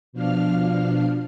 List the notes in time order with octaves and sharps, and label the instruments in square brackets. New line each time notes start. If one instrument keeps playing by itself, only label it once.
[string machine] B2 F3 D4 F5 F6